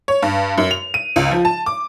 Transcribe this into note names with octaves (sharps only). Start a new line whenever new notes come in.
C#5
G2
F#2
F7
D#7
C#2
F3
A5
D6